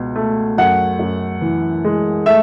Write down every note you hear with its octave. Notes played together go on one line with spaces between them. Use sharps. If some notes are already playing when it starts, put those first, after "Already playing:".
Already playing: C#2 B2
A3
F#2 F#5
F#2
E3
G#3
A3 E5